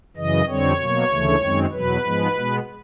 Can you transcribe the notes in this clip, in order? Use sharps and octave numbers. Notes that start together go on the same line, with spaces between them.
F#2 C#3 E3 D#5
F2 D3 G3 C4 C#5
B2 F#3 A#3
D2 C#3 E3 A3
F#2 D#3 G#3 C4
E2 B2 F#3 B4
G#2 F3 G#3 B3
B2 G#3 B3